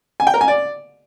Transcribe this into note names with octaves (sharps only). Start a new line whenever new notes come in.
G#5
G5
A#4
G#5
D5